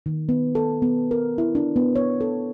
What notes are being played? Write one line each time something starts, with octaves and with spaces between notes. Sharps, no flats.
D#3
B3
A4
B3
A#4
E4
D4
B3
C#5
A4